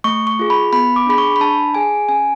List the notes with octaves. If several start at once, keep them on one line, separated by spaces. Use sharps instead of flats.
A3 C#6
C#6
F4 G#4
B5
B3 B5
D6
D4 G#4 B5
C#6
B5
D4 A5
G#4 G#5
C#4 G#5